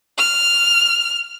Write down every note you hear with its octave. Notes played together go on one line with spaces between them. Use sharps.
F6